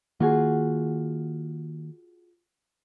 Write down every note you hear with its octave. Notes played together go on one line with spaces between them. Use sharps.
D#3 A#3 F4 F#4 G#4